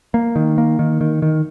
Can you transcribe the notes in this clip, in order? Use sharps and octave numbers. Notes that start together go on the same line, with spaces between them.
A#3
D#3
A#3
D#3
D#3
D#3